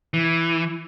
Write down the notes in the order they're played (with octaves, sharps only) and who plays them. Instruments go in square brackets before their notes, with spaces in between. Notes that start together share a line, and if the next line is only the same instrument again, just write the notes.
[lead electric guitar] E3